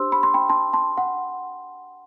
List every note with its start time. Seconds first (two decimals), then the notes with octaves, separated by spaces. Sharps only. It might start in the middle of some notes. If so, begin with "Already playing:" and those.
Already playing: D4 G4 C5 C6 E6
0.12 B5
0.23 C6
0.34 G5 B5
0.49 A5 C6
0.73 A5 C6
0.97 F#5